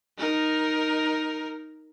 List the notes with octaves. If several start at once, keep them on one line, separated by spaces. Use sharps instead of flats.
D#4 A#4